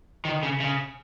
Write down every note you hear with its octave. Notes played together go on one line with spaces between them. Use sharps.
D#3
C#3
C#3